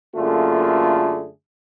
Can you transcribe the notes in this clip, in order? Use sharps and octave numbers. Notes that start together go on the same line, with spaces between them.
F#2 D3 A3 A#3 F4 G#4